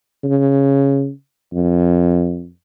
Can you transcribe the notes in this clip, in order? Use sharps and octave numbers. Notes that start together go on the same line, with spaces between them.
C#3
F2